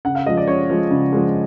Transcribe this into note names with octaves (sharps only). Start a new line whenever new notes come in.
C#3 F#5
F5
F3 G#3 D#5
D5
C#3 C#5
F3 G#3
C#3
F3 G#3